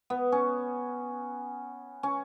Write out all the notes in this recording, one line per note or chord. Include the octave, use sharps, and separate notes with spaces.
B3
C#4
C#4